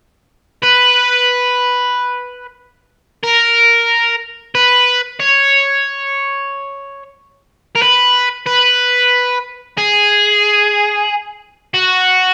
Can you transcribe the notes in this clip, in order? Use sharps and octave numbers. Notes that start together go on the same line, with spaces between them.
B4
A#4
B4
C#5
A#4
B4
B4
G#4
F#4